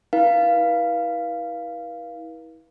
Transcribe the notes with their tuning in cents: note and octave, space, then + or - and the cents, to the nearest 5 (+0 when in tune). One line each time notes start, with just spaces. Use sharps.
E4 -35 B4 -40 F5 -10